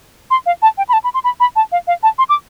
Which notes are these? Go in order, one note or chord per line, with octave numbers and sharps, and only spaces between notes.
C6
F5
A5
G5
B5
A5
B5
C6
B5
B5
A5
F5
F5
A5
C6
D6